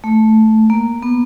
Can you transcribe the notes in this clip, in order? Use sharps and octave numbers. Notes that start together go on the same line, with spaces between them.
A3
A#3
B3